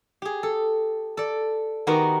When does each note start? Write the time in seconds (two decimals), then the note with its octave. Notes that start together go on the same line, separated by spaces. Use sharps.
0.22 G4 G#4
0.43 A4
1.17 A4 D5
1.87 D#3 B3 F#4 G4 A#4